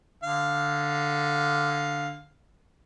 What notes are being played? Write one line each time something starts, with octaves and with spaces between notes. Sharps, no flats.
D3 F5